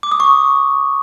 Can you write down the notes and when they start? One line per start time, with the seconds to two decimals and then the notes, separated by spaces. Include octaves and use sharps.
0.03 D6
0.12 D#6
0.20 C#6